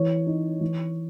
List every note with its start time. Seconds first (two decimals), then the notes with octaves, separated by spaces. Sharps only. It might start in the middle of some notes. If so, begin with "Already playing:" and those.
Already playing: E3 C#5
0.27 D#4
0.61 E3